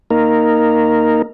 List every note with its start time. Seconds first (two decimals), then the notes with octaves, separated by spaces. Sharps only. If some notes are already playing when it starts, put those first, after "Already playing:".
0.10 A#3 D#4 A#4